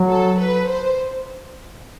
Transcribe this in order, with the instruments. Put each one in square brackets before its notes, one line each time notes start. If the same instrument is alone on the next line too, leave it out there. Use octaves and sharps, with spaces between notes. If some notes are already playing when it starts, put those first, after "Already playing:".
Already playing: [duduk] F#3
[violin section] A4
B4
C5